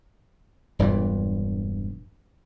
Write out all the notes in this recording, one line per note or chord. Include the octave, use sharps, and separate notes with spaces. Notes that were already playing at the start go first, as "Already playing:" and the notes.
E1 G2 A#2 E3